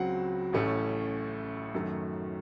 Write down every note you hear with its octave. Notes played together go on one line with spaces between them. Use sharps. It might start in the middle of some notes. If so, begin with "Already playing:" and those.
Already playing: C#2 C#3 F#3 C4 F#5
A1 A2 A3 C#4
F#2 D#3 A3